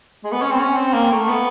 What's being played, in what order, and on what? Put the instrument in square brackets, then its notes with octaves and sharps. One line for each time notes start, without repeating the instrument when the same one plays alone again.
[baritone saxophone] G#3
B3
C#4
C4
C#4
C4
A#3
A3
B3